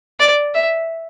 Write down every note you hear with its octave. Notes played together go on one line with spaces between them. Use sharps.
D5
E5